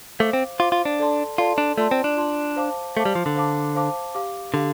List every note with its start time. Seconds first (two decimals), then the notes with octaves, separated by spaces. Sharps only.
0.19 A3 C5 F5 D6
0.33 C4
0.59 F4 C5 F5 D6
0.72 F4
0.85 D4
0.99 A4 D5 A5 C6
1.38 F4 A4 D5 A5 C6
1.58 D4
1.78 A3 F4 D5 A5 C6
1.91 C4
2.04 D4
2.17 F4 D5 A5 C6
2.56 C5 F5 A5 D6
2.97 A3 C5 F5 A5 D6
3.05 G3
3.15 F3
3.26 D3
3.36 C5 F5 A5 D6
3.75 C5 F5 A5 D6
4.15 G4 F5 D6
4.54 D3 G4 F5